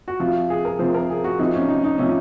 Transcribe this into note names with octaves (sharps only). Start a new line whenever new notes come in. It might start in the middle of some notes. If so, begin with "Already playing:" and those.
F#4
C3 F3 F4
G#4
A#4
C3 F3 C5
A#4
G#4
F#4
C3 F3 D#4
C#4
D#4
D#4
C3 F3 C#4